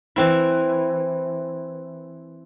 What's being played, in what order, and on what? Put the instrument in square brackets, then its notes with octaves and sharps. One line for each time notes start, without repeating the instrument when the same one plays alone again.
[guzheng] E3 C4 E4